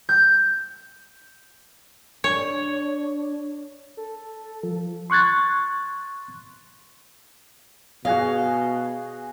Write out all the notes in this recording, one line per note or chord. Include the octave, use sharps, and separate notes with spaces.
G6
D4 C#5
A4
F3
C6 C#6 F#6 G#6 A6
B2 F#4 G#4 D#5 F5